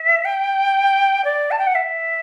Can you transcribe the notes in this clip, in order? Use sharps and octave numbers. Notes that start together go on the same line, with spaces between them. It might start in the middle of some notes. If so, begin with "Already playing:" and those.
Already playing: E5
G5
D5
A5
G5
F#5
E5